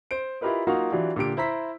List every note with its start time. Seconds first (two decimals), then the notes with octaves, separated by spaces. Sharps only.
0.11 C5 D7
0.41 E4 F4 G4 A#4 B4 D#5
0.67 F#3 A#3 D#4 F4 F#4 F5
0.92 E3 F#3 D4 F4 G4
1.16 A#2 D3 G4 D7
1.37 E4 C5 A#5 E6 B6